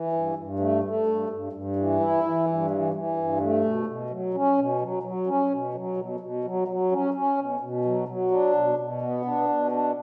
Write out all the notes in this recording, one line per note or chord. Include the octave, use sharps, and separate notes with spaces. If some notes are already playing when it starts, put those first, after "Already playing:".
Already playing: E3
G2
G2
A3
A3
G2
G2
G2
E3
E4
E3
G2
E3
E3
G2
A3
B2
B2
F#3
C#4
B2
F#3
F#3
C#4
B2
F#3
B2
B2
F#3
F#3
C#4
C#4
B2
B2
F#3
F#3
D4
B2
B2
B3
D4
B2
D4